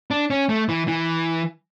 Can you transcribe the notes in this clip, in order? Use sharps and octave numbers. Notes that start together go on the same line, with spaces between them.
D4
C#4
A3
E3
E3